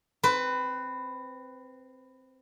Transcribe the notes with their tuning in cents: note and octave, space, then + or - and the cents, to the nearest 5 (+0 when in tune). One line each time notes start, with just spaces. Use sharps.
C4 +0 B4 +15